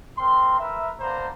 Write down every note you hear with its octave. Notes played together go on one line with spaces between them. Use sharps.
C4 A#4 C6
A#4 B4 E5
A#3 B3 D4 C5 A#5